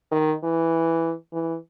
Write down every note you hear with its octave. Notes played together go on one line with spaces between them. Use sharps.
D#3
E3
E3